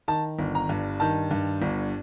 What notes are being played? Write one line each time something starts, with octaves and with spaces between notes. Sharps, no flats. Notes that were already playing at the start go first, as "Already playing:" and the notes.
D#3 A5
G1
A#5
G2
D#3 A5
G2
G1